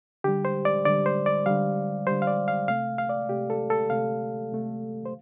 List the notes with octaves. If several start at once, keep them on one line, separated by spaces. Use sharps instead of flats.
D3 G3 G4
C5
D5
D3 G3 D5
C5
D5
D3 G3 F5
D3 G3 C5
F5
D5
F5
C3 A3 F5
F5
D5
C3 A3 G4
A4
A4
C3 A3 F5
C3 A3
C5